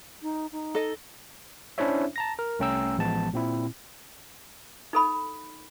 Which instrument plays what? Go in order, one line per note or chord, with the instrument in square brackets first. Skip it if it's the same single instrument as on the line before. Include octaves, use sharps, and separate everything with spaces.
[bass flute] D#4
D#4
[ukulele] A4 D#5
[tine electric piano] C#4 D4 E4 C5 C#5 E5
A5 A#5 A#6
A#4
C2 A3 C#4 G5 A#5 E6
A1 F3 G#3 B3 A5
A#2 C4 E4
[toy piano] D#4 A4 B5